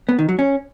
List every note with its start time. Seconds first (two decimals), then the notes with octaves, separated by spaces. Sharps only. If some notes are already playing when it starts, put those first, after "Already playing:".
0.09 B3
0.19 D#3
0.29 F#3
0.39 C#4